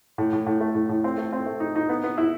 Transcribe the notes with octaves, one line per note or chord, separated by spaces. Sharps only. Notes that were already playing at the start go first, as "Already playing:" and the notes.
A2
A2
A2
A3
A2
A2
C4
A3
C4
A3
D#4
D#4
B3
B3
E4